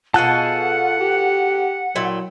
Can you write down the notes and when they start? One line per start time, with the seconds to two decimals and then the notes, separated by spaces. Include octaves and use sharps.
0.14 B2 F4 G#4 A4 F#5 A5 F#6
1.01 G4
1.95 A#2 F#3 E4 G5